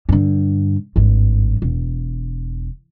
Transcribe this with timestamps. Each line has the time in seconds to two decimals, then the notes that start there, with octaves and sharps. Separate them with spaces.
0.09 G2 D3
0.96 G#1 G2
1.62 E1